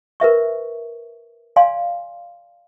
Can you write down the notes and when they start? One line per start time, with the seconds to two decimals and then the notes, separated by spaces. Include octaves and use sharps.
0.20 A#4 B4 E5 C#6
1.56 D5 F5 G#5 C6